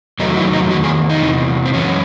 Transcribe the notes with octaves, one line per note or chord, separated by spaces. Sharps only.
E2 D#3 F#3 A3 D#4
E4
D#4
E2 D#3 A3 F#4
G#4
D#4
E2 C3 E3
C4
F#2 E3 G#3 C#4